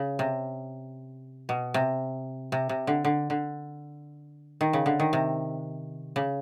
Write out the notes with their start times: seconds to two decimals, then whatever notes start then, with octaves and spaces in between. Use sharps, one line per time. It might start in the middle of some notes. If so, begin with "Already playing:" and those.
Already playing: C#3
0.19 C3
1.49 B2
1.74 C3
2.52 C3
2.69 C3
2.87 D3
3.05 D3
3.30 D3
4.61 D#3
4.73 C#3
4.86 D3
5.00 D#3
5.13 C3
6.16 C#3